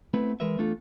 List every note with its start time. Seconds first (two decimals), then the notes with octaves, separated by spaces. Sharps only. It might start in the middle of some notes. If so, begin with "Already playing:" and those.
0.14 A3 B3 C4 E4 B4
0.40 E3 G#3 A#4 B4 E5
0.58 E2 A3 D4 F4 A4